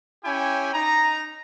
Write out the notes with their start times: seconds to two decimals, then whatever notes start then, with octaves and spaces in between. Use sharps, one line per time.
0.25 C#4 E4 G4 G5 G#5
0.74 D#4 A#5